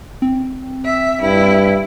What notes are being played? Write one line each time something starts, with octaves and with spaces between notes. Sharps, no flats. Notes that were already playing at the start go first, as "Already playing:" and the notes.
C4
E5
G2 E4